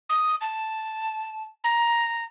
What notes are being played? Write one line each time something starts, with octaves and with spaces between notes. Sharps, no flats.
D#6
A5
A#5